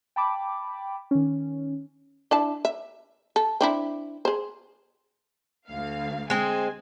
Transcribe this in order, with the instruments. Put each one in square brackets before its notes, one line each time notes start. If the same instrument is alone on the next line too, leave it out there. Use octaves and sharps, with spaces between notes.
[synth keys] G5 A5 B5 D6
D#3 C#4
[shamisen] D4 E4 A5
E5
A4
C4 D4 E4
G#4 C5
[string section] D2 F5
[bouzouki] G#3 C4 [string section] G#5